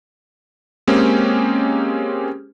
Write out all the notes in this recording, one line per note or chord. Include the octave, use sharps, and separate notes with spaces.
G#3 A#3 C4 C#4 G4 G#4